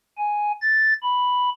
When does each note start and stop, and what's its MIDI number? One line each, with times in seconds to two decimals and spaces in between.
0.18 0.52 80
0.61 0.93 93
1.02 1.50 83